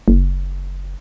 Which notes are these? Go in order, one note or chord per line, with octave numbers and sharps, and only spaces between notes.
F#1